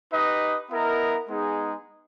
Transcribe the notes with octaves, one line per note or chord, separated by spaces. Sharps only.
D#4 G4 B4 D#5
B3 E4 A#4 D#5
G#3 B3 D#4 G#4